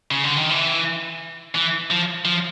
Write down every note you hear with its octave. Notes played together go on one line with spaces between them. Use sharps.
C#3
D3
D#3
E3
E3
F3
F3